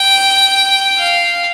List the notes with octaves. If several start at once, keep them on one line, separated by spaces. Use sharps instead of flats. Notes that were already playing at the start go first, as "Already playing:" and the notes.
Already playing: G5
F5